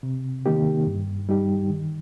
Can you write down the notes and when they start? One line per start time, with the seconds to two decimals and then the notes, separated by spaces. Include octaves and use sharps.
0.03 C3
0.46 D#3 A#3 D#4 G4
0.87 G2
1.29 G3 D#4 G4
1.70 D#3